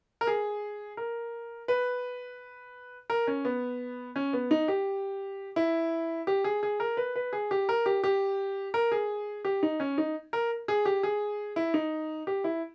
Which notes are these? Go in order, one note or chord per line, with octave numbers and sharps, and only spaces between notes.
A#4
G#4
A#4
B4
A#4
C#4
B3
C#4
B3
D#4
G4
E4
G4
G#4
G#4
A#4
B4
B4
G#4
G4
A#4
G4
G4
A#4
G#4
G4
D#4
C#4
D#4
A#4
G#4
G4
G#4
E4
D#4
G4
E4